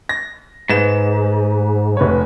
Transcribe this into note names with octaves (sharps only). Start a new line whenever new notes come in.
A#6
G#2 B4 E7
F1 B4 C#5